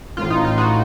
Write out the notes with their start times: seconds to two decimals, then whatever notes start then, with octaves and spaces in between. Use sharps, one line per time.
0.17 A1 A2 F4
0.30 D#4
0.45 F4
0.58 D#4 F#4